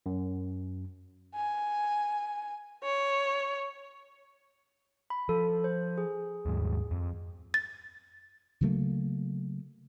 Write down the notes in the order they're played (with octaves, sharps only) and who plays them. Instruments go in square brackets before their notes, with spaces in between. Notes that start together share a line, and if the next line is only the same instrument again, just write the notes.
[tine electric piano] F#2
[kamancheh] G#5
C#5
[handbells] B5
[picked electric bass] F3 [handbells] A4
[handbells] C5
G#4
[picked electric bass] D#2 G#2 G3
F2
[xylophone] A6
[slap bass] C#3 F#3 A3 A#3